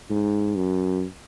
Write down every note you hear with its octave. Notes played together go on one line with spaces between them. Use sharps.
G#2
F#2